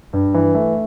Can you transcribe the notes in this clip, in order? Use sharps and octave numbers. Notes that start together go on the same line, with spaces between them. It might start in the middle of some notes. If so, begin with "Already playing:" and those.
G2
E3
A3